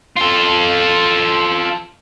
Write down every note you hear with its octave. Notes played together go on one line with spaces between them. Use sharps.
F4 A4